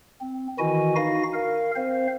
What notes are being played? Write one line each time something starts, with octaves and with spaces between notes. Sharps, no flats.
C4
D#3 E3 E4 F#4 D#5 G#5
D#4 F#4 F5 A#6
A#4 F5
C4 C5 F5